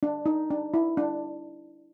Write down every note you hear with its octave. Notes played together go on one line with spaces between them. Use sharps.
D4
D#4
D4
E4
D4